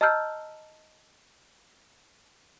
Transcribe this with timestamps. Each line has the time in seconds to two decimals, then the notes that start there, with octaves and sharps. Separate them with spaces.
0.01 D#5 A5 A#5 E6 F6 G6